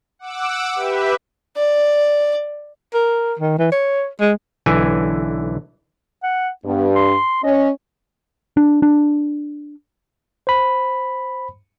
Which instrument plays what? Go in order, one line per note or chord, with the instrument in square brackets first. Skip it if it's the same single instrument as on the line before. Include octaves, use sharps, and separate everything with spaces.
[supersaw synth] F#5 D6 E6
G4 B4 E5
[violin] D5
[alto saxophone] A#4
D#3
E3
C#5
G#3
[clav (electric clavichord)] B1 D3 E3 G#5
[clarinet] F#5
[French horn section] G2 [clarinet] B3
[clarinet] C6
[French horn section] C#4 [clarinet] D#5
[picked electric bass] D4
D4
[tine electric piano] C5 B5